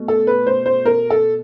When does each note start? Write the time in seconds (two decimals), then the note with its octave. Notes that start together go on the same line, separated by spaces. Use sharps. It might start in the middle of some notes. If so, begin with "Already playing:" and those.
Already playing: B2 A3
0.08 A4
0.27 B4
0.47 C5
0.66 C5
0.85 A#4
1.10 A4